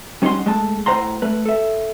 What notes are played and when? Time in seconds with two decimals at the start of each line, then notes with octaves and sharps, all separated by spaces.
0.22 G3 C#4 D#4 F5 F#5 C6
0.46 G#3 A3 A5
0.86 A2 C5 F#5 A#5 C6
1.22 A3 B4
1.45 A4 E5